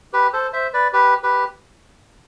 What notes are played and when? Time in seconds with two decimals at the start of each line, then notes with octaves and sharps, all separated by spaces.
0.13 G4 B4
0.33 A4 C5
0.53 C5 E5
0.73 B4 D5
0.93 G4 B4
1.23 G4 B4